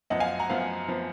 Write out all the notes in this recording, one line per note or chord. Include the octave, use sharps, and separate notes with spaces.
F#2 F3 B3 D#5 F#5
F5 G#5
F#5 A#5
F#2 F3 B3 F5
F3 B3